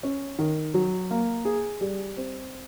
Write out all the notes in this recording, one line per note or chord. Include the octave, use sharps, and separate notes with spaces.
C#4
D#3
F#3
A#3
G#4
G3
C4